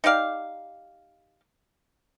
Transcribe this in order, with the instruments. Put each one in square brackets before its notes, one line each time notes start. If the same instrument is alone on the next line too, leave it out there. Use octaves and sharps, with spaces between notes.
[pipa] D#4 G4 D5 F5